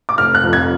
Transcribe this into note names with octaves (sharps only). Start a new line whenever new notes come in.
D6
F1 F6
F#6
F2 F3
G#6